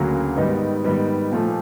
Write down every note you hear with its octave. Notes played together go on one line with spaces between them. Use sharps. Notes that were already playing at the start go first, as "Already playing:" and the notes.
Already playing: D2 C#3 F#3 A#3
G#2 D#3 G3 B3 D#4
G#2 D#3 G3 B3 D#4
A#2 F3 A3